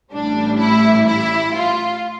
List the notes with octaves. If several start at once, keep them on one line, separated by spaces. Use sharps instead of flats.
A1 A2 G3 D4
E4
E4
F4